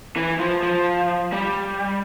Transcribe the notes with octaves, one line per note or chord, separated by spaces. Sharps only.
E3
F3
F3
G3